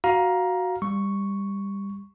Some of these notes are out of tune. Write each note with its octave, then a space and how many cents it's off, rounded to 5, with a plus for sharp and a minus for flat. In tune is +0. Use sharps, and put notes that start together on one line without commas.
F#4 +0 F5 +5 A#5 +15
G3 +20 C#6 +0